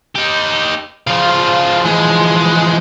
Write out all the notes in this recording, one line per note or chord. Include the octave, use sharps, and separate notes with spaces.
D#4 G4
C#3 F3 F4 F5
E3 F3 G#3